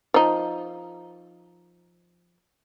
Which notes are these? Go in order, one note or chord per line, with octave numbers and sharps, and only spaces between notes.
F3 D#4